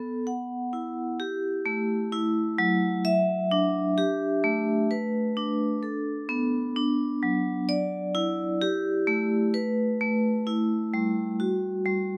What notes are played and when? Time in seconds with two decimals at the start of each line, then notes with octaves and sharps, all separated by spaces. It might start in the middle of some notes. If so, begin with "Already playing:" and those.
Already playing: B3 A4
0.27 F#5
0.73 E4
1.20 G4
1.66 A3
2.12 E4
2.58 F#3
3.05 E5
3.51 D4
3.98 G4
4.44 A3
4.91 B4
5.37 D4
5.83 A4
6.29 B3
6.76 D4
7.23 F#3
7.69 D5
8.15 E4
8.62 G4
9.07 A3
9.54 B4
10.01 A3
10.47 E4
10.94 G3
11.40 F#4
11.86 G3